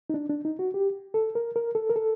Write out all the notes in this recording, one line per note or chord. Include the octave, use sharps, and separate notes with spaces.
D#4
D4
D4
D#4
F#4
G4
A4
A#4
A#4
A4
A#4
A4